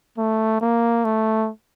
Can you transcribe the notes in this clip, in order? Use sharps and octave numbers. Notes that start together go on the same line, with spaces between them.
A3
A#3
A3